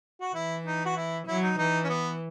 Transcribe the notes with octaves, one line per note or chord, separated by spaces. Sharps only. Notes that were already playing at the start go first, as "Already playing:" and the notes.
F#4
E3 E4
D#4
F#4
E4
F#3 E4
D#4
E3 D#4
C#4
B3